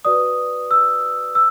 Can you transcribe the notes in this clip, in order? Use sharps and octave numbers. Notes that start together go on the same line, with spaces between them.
F#4 B4 D5 D#6
E6
E6